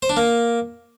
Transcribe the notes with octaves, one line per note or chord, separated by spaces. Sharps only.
C5
D4
A#3